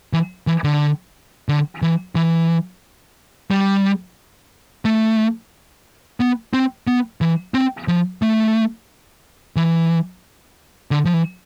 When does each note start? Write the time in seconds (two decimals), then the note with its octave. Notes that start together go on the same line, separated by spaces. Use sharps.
0.13 E3
0.47 E3
0.64 D3
1.49 D3
1.82 E3
2.15 E3
3.51 G3
4.85 A3
6.20 B3
6.53 C4
6.87 B3
7.21 E3
7.54 C4
7.88 F3
8.22 A3
9.56 E3
10.91 D3
11.05 F3
11.14 E3